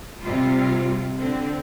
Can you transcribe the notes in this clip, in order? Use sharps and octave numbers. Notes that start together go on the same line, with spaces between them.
C3 G3 F4
D3 C4